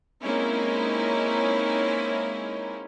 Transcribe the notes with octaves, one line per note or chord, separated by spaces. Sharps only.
G#3 A#3 C4 C#4 D#4 E4